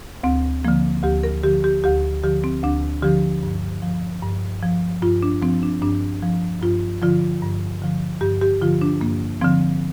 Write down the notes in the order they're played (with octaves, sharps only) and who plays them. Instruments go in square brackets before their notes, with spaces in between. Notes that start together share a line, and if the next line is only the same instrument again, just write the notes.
[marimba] D2 C4
D3 F3 A#3
D2 G4
A#4
D3 F3 G4
G4
D2 G4
D3 F3 G4
C4
D2 D4
D3 F3 G4
G2
F3
G2
F3
G2 F4
D4
F3 C4
D4
G2 D4
F3
G2 F4
D3 F3 F4
G2
D3 F3
G2 G4
G4
D3 F3 F4
D4
G2 A#3
D3 F3 C4